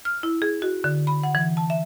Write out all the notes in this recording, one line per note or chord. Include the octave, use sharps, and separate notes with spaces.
F6
E4
G#4
F#4
D3
B5
F#5
E3
A5
E5